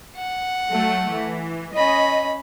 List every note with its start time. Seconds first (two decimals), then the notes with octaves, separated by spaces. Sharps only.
0.16 F#5
0.71 F#3 A3
1.11 E3
1.76 C#4 D#5 B5